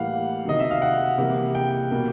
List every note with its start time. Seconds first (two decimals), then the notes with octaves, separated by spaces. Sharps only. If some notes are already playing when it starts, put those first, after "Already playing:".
Already playing: A2 E3 G3 A#3 F5 F#5
0.45 C3 D#3 F#3 D#5
0.60 E5
0.71 F5
0.82 F#5
1.18 C3 E3 G3 A#3
1.55 G5
1.91 B2 G3 A#3